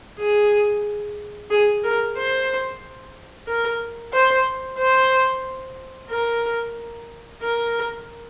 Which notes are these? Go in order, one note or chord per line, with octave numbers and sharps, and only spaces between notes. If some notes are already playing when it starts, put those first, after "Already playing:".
G#4
G#4
A#4
C5
A#4
C5
C5
A#4
A#4